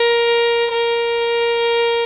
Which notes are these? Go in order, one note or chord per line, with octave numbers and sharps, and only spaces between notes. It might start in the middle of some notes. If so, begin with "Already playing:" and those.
Already playing: A#4
A#4